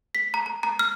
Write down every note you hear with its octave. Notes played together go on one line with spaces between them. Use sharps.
B6
A#5
A#5
A#5
F6